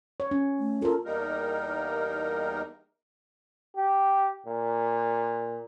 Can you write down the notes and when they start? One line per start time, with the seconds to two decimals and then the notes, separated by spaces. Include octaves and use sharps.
0.20 C#5
0.31 C#4
0.59 A3
0.82 F4 A4 A#4
1.05 E2 G3 A#3 D#4 A#4
3.76 G4
4.46 A#2